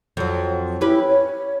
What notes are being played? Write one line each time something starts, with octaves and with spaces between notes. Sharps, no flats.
F2 F#3
C#4 E4 G4 B4
C#5